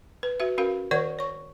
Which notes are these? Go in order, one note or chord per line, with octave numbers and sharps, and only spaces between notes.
B4
F#4 B4 E5
C#4 F#4 A#4 F5
D#3 A#4 C#5 D5 F#5 C#6
C#5 C#6